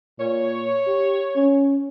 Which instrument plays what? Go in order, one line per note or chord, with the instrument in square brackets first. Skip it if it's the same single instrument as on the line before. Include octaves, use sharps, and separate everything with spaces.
[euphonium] A#2 [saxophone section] C#5
[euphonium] G4
C#4